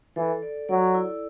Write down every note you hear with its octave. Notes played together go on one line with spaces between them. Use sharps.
E3 A4
D5
F#3 D5
E4